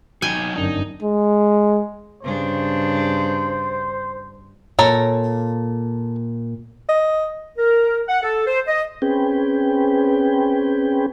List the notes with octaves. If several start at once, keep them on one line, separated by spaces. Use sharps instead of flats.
F#3 D#4 F#4 G5 G#5
G1 F#2 D4 D#4
G#3
G2 C#3 D4 C5
A#2 A4 C#5 A#5
D#5
A#4
F#5
A4
C5
D#5
C4 C#4 G#4 B4 G5